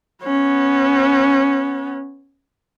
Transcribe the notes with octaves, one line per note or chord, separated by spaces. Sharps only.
B3 C#4